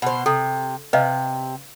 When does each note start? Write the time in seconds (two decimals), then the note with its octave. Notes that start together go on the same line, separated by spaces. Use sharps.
0.02 B2 C5
0.26 C3 A4
0.93 C3 B4 D#5 F5